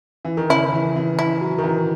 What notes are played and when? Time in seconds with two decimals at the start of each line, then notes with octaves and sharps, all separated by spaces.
0.25 E3
0.37 D#3
0.49 C#3 E4
0.72 E3
0.96 E3
1.19 E4
1.41 F#3
1.58 D#3
1.64 E3